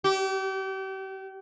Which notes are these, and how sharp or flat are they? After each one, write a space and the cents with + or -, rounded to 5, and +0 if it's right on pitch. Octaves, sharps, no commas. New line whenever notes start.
G4 -35